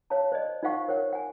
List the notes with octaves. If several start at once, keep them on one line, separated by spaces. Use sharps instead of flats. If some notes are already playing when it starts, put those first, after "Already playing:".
C#5 F5 A5 A#5
C5 D5 D#5
D#4 F4 C5 F5 F#5 C#6
A#4 C5 C#5 F#5
F#5 G#5